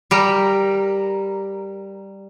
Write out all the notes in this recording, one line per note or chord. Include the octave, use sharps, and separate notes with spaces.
G3 G4 A#4